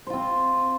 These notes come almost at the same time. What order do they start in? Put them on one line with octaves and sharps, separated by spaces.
C5 F4 C4